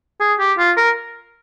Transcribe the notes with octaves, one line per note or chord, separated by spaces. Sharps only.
G#4
G4
F4
A#4